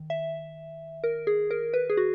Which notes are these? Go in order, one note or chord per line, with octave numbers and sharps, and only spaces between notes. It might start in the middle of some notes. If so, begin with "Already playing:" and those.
Already playing: D#3
E5
A#4
G#4
A#4
B4
G#4
F#4